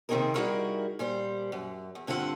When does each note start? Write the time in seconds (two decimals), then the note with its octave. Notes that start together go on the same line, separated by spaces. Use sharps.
0.09 C3 D#3 C4 D#4 G#4 A#4
0.34 G3 D#4 E4 F#4 G#4 A#4
0.99 A#2 G3 C5
1.52 F#2
1.95 E2
2.07 G2 D3 C4 F4 A4 F#5